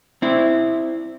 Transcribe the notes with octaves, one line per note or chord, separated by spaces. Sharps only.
C4 E4